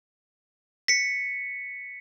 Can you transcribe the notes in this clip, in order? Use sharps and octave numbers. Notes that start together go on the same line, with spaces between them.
B6 C#7